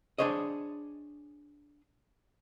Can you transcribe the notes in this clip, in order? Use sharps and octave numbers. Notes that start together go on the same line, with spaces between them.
D4 G#4 C5 C#5 D#5